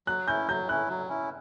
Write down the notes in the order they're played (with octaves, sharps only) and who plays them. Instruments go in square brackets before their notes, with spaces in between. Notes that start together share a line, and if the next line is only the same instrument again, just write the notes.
[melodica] F#3 [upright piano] F#6
[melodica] C#4 E4 [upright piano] G6
[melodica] F#3 [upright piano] G6
[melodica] C#4 E4 [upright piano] F#6
[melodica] F#3
C#4 E4